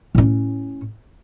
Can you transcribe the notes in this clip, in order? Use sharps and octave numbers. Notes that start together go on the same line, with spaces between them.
A2 C#4